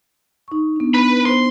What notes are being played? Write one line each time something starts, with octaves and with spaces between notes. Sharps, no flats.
D#4 C#6
B3 D4
B4 B5
B3 C5 C6